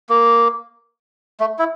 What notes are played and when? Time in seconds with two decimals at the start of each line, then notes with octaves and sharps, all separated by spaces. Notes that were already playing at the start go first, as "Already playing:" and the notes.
0.09 A#3
1.40 A3
1.59 E4